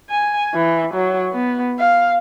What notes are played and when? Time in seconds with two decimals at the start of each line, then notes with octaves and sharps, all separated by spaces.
0.10 G#5
0.54 E3
0.94 F#3
1.33 B3
1.79 F5